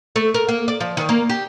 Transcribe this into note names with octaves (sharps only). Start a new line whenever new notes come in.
A3
A#4
A#3
D5
F3
D#3
A#3
G4